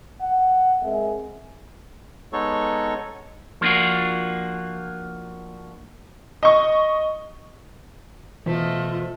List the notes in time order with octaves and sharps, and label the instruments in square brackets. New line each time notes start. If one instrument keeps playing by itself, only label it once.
[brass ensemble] F#5
G#3 C4 G#4 A#4 E5
[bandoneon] G#3 B3 D#4 A4 C#5 C#6
[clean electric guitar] F3 A#3 D4 F4 F#4
[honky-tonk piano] D#5 C#6
[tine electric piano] B2 C5 B6 [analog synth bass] E3 [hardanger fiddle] A3 D#5 [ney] F4